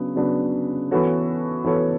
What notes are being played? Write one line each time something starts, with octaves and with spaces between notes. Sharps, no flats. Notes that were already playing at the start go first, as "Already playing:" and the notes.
Already playing: C#3 F#3 B3 D4
C#3 F#3 B3 D4
E3 B3 F#4 A4 C#5
E3 B3 F#4 A4 C#5